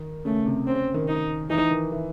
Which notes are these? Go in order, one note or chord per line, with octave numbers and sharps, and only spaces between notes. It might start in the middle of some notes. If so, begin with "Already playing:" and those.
Already playing: D#3
C#3 A3
C3
C#3 C4
D#3
D#4
E3 D#4
D#3
E3